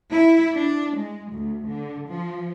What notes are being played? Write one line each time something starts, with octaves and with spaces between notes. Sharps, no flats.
E4
D4
G#3
D2
D3
F3